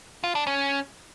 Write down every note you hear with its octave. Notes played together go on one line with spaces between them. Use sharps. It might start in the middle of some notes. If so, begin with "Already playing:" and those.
F4
D4
C#4